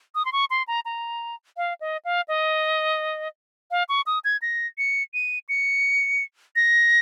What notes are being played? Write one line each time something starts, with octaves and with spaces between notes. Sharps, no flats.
D#6
C6
C#6
C6
A#5
A#5
F5
D#5
F5
D#5
F5
C#6
D#6
G#6
A#6
C#7
D#7
C#7
A#6